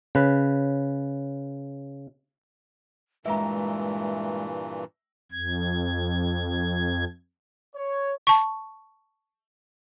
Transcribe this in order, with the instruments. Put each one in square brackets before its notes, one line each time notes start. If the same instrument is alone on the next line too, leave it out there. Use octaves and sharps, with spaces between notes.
[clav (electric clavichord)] C#3 B4
[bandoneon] G2 A#2 E3 [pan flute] G#3 [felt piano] E5 A#5
[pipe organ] F2 G#6
[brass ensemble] C#5
[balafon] A5 C#6